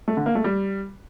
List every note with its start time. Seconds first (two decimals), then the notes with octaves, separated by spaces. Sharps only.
0.08 A3
0.17 D3
0.26 A#3
0.35 A3
0.44 G3